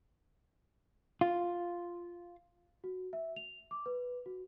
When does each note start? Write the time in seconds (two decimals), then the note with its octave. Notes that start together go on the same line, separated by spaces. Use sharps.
1.21 F4
2.84 F#4
3.13 E5
3.36 F7
3.71 D6
3.86 B4
4.26 F#4